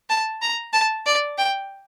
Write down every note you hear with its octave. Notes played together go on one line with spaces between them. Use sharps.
A5
A#5
A5
D5
G5